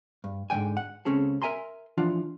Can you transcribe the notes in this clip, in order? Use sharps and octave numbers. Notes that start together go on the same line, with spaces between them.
G2
G#2 D3 F#3 G5 G#5
F#5
C#2 C#3 C4 C#4 G#4 A4
A#4 E5 G#5 A#5 C6
E3 F3 D4 F4 F#5